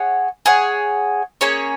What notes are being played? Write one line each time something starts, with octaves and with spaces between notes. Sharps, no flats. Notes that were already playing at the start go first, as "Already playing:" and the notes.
Already playing: G#4 C#5 F#5
G#4 C#5 F#5
A#3 C#4 G#4 C#5